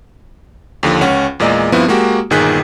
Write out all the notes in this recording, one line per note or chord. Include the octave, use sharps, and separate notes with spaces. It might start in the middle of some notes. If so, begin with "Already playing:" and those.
D#2 D3 F3
C#2 C#4 F#5
E2 A#2 G#3 D5 D#5
G2 F3 B3 C4 E4
G#3 A#3 F#4 G4
G1 A#2 D#3 G#4 F#6 B6